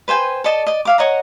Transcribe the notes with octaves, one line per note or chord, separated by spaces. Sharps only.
B4 C5 G5 G#5
A4 D5 D#5 A5
D5 D#5
E5 F5 D6
C#5 D#5 F#5 A#5